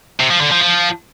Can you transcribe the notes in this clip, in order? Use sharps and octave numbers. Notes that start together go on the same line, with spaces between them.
C3
F3
D3
F3
F3